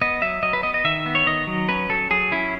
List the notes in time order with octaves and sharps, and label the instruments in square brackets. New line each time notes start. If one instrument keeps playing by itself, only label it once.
[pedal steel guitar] B3 D#5
F#3 E5
F#3 D#5
B4
B3 D#5
D#5
D#3 E5
B3
C#5
D#3 D#5
F#3
C#4 B4
F#3 A4
F#3 G#4
C#4 E4